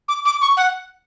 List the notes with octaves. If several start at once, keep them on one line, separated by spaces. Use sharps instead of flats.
D6
D6
C#6
F#5